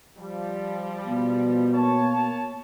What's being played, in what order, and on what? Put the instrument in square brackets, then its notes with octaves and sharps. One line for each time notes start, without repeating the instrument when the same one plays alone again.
[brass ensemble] F3 G3
[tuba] B2
[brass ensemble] A#3 C#5 A5